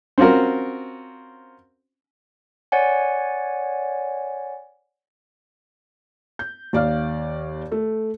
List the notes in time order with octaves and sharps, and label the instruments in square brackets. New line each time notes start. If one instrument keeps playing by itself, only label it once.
[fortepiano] C4 C#4 F4 F#4 A#4
[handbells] C#5 D5 F#5 G#5
[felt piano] G6
D#2 D5 F5 F6
A3